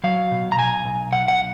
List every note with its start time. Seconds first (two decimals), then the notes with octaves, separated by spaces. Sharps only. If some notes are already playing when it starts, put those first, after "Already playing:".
0.04 F#3 F5
0.31 B2
0.52 A#5
0.58 B1 G#5
0.85 B1
1.13 B1 F#5
1.28 F#5